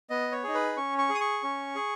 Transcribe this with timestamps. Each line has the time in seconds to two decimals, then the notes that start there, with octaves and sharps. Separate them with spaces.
0.10 B3 D#5
0.32 C#5
0.44 D#4 G#4
0.54 B4
0.77 C#4 C#6
0.98 C#6
1.09 G#4
1.15 D#6
1.21 C#6
1.43 C#4
1.75 G#4